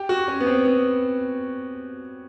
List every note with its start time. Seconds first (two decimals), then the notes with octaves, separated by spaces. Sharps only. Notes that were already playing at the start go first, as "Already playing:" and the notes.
Already playing: G4
0.09 F#4
0.28 C#4
0.40 B3
0.46 C4
0.65 B3